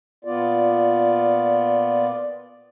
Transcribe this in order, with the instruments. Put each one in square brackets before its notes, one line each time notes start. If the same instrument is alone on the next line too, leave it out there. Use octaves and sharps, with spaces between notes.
[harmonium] A#2 B3 F4 D5